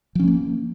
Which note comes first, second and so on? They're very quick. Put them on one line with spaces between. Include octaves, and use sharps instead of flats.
F3 C#4 G#3 A#3